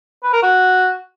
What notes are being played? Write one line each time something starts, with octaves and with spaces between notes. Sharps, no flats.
B4
A#4
F#4